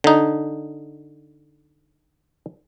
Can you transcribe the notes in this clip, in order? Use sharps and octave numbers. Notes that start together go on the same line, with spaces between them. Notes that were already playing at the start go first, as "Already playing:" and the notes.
D3 D#4